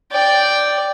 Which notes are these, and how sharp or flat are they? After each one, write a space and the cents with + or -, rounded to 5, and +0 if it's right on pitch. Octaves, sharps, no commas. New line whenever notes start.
D5 +0 G5 +0